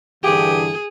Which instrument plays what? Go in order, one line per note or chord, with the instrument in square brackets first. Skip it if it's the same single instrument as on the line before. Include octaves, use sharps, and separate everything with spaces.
[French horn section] G2 D3 E3 [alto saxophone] G4 [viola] G#4